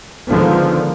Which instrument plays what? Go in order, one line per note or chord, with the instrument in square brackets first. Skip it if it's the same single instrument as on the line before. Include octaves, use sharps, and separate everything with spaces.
[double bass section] D3 D#3 F3 G#3 B3